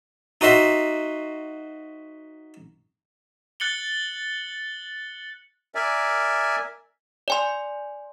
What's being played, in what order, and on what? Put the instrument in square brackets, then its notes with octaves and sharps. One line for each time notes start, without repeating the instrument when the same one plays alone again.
[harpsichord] D#4 F#4 C5 E5 C6
[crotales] F#6 A6 C#7 F#7 G7
[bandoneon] A#4 D5 E5 G#5
[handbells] D5 G#5 C6